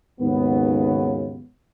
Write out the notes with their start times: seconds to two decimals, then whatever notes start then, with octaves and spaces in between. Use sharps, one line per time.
0.21 D#2 G#2 C#3 F#3 B3